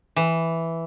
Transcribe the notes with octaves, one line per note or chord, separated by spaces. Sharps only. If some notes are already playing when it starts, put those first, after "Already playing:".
E3